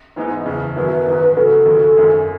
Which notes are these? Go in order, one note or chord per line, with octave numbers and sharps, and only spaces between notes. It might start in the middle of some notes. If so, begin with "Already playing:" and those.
G#2 E3 G#3 B3 D#4
F#1 E2 C#3
F#2 D#3 F#3 B3 E4 B4
A1 G#2 D#3
C#3 F#3 B3 F#4 A4
D#2 C#3 F#3 C#4
G#1 F#2 D#3 G#3